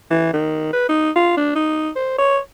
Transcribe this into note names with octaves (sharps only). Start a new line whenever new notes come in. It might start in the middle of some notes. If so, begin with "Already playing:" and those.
E3
D#3
B4
D#4
F4
D4
D#4
C5
C#5